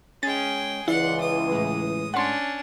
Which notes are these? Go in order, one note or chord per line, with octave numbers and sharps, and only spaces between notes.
G#3 C#4 G#4 G5 A6
C#2 E3 E4 D5 F#5 C6
D#6
A2 G#3
C#4 D4 F#5 C6